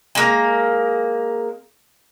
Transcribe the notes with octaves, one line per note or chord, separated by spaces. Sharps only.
G#3 A#3